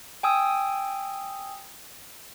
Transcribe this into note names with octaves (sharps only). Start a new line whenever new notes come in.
G5 G#5 D#6 E6